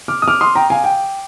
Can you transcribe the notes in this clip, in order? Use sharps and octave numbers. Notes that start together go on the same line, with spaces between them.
D6 F6
D#6
D6 F6
C6 D#6
G5 A#5
F5 G#5
G5